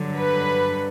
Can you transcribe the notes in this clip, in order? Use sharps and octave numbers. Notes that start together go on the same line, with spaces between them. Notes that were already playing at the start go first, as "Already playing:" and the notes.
Already playing: G2 D3 F#3
B4